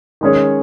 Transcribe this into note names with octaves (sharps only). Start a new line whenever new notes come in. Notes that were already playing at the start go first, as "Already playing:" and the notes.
D#3 G#3 C#4 G#4 C#5